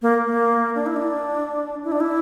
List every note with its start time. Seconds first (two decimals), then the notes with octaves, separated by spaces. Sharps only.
0.02 A#3
0.26 A#3
0.75 D4
0.86 E4
0.96 D4
1.84 E4
1.92 D4
2.00 E4